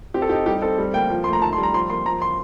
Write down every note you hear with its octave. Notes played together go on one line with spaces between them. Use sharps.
C4 G4
A4
D#4 G4
G3 G4
C4 A4
G3
A#3 G5
F3
A3 C6
A#5
D#3 A5
C6
G3
A#5
F3 C6
A#3 C6
F3 A#5
C6